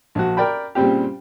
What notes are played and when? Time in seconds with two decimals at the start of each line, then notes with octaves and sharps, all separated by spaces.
0.15 A#1 F#4
0.37 A#4 D5 G5 B5
0.75 A#2 C#3 G3 C4 G4